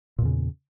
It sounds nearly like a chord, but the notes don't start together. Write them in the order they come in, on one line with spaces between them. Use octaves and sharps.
A#2 E2 C#3